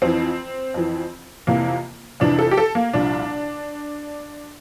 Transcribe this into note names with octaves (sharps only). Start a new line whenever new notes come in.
F2 E3 C4
F2 E3
F2 C3 E3 A#3
F2 C3 E3 D4
A4
G4
A4
A#3
C2 A#2 F3 D4